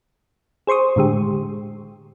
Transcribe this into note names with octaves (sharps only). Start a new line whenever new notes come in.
G#4 C5 C6 C#6 D#6
A2 D3 G#3 G4